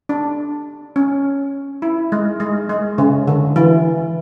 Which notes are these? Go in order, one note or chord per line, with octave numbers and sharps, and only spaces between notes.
D4
C#4
E4
G#3
G#3
G#3
C#3
D3
E3